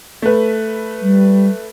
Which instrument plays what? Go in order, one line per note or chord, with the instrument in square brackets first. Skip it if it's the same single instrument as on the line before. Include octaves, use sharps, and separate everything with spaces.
[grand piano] A3 B4
[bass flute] G3